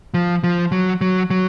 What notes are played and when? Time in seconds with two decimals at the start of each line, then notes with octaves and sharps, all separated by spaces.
0.14 F3
0.44 F3
0.72 F#3
1.01 F#3
1.30 F#3